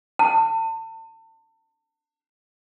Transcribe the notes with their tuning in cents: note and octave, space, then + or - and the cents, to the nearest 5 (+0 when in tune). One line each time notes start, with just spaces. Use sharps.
A5 +35